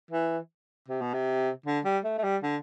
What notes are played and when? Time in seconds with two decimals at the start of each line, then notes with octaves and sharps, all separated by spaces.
0.11 E3
0.88 C3
1.01 B2
1.13 C3
1.66 D3
1.85 G3
2.04 A3
2.18 A3
2.24 G3
2.43 D3